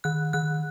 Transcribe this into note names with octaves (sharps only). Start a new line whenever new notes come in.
D#3 F#6
D#3 F#6